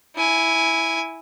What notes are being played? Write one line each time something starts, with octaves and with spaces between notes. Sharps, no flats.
E4 G#5